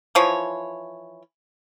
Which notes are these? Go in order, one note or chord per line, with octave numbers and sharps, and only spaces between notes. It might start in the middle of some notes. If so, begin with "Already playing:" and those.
E3 F3 C#5